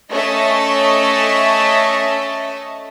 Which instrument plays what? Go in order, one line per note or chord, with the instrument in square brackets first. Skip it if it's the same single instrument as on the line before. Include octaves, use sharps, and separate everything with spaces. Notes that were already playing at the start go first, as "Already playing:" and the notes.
[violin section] A3 C#4 D#5 E5 A5